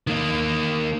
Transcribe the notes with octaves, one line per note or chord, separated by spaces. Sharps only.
D#3 A#3